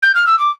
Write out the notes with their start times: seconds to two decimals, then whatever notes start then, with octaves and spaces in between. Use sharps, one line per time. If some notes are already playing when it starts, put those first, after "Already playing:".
0.02 G6
0.15 F6
0.26 E6
0.39 D6